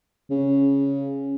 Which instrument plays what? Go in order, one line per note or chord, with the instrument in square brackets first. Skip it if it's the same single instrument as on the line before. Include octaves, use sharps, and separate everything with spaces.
[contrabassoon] C#3